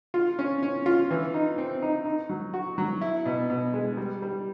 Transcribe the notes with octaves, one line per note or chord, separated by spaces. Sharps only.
F4
C#4
C#4
F4
E3
D#4
C4
D#4
D#4
F#3
F#4
F#3
E4
B2
B2
G#3
G3
G3